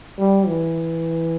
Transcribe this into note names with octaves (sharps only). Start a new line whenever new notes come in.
G3
E3